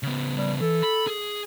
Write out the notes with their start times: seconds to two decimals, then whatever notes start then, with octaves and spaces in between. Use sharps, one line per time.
0.03 C#3 B3
0.37 G3
0.61 E3 A4
0.83 B5
1.07 G#4